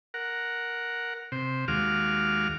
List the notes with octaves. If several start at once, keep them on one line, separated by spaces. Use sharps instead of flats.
A#4 F#5
C3 C5
D#2 G#3 F#4 F5 D6 F6